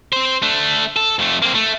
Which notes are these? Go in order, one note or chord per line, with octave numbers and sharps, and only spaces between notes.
C4 C5
A3 D4
A4
F2 A3
A#3 C4
A3